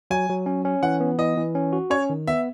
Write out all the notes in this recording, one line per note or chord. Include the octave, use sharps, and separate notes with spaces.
F#3 G#5
F#3
C#4
C#4
E3 F#5
B3
E3 D#5
E3
C#4
F#4
C#4 C#5
D#3
B3 E5